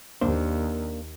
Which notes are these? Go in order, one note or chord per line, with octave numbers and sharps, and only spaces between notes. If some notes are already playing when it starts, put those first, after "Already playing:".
D#2 A#3 D4 C5